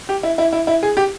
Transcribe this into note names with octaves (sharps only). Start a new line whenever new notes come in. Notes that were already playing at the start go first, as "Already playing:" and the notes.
G4
E4
E4
E4
E4
G#4
G4